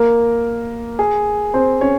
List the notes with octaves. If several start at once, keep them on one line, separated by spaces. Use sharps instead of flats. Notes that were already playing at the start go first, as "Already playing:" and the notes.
Already playing: A#3 A#4
G#4
C4 C5
C#4 C#5